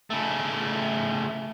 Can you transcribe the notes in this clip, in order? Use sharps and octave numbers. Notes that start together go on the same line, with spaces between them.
C#3 A3